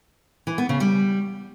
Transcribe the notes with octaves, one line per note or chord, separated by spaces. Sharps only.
E3
B3
C#3
G3